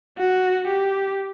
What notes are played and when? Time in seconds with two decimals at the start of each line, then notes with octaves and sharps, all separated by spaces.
0.18 F#4
0.68 G4